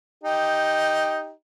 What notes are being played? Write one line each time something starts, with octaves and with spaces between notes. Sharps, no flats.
D#4 G4